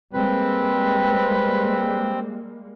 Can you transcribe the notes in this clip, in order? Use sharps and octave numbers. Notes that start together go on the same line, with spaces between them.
G3 G#3 A#3 C4 B4